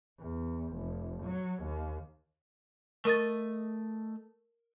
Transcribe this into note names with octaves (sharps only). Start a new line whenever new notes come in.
E2
F1
F#3
D#2
A3 A#4 D#5 C#6 A6